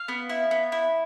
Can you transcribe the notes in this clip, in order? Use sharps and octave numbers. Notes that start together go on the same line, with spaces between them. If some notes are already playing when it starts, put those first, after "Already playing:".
Already playing: F5
B3
E4
B3
E4